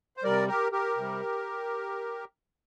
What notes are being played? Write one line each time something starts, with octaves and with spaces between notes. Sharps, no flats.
C5
C3 G3 A#4 D5
G4 A#4
G4 A#4
C3 G3